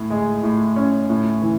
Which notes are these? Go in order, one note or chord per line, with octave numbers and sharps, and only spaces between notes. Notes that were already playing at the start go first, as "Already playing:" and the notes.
Already playing: A2
G#3
A2
C#4
A2
E3